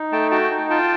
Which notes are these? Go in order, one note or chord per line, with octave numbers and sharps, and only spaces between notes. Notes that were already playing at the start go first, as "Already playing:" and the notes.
Already playing: D#4
A3 G5 A5
F#4 G5 A5
D#4
F4 G5 A5